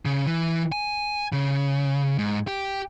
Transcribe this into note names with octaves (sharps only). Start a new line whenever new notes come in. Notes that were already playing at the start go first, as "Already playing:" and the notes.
C#3
E3
G#5
C#3
G#2
G4